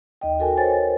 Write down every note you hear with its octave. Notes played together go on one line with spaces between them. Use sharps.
D#2 D#5 G5
F#4 A4 A#4 G#5
A#4 C5 C#5 G#5 A6